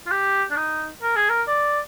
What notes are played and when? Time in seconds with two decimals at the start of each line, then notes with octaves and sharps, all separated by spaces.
0.07 F4
0.11 G4
0.51 D4
0.57 D#4
1.03 A#4
1.16 G#4
1.29 A#4
1.48 D5